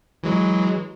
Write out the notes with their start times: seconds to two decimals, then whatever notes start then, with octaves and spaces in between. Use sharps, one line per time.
0.23 E3 F#3 G#3